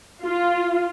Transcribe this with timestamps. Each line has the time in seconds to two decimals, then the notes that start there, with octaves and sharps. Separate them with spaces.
0.25 F4